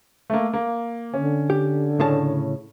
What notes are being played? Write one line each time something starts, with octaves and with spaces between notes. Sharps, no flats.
A3 A#3
A#3
D3 C#4
G4
A2 C#3 A5